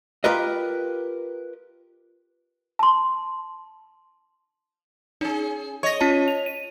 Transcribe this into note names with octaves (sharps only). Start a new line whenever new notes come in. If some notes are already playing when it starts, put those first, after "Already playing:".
F4 G4 A#4 B4 D#5
A5 C6
C#4 D#4 G#4
C#5 D#5 C#6 A#6
C#4 F4 A5
F7
D#7